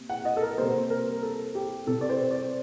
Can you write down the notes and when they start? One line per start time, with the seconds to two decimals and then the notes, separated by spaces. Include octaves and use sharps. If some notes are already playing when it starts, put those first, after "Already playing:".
Already playing: C3 A#3
0.10 F#5
0.25 D#5
0.37 A4
0.42 A#4
0.58 C3 G3 A#3 C5
0.90 A#4
1.23 A4
1.55 G4
1.87 C3 G3 C4 A4
2.01 D5
2.09 C5
2.31 D5